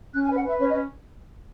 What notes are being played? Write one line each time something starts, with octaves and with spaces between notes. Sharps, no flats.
C#4 F#6
G#5
B4
F#5
B4 E5
C#4 C#5
D#5
C#4